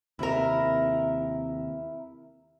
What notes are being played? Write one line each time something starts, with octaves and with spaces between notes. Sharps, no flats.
D#2 C3 E4 A#4